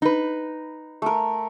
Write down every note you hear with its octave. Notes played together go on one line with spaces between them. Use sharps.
D#4 B4
A3 A#4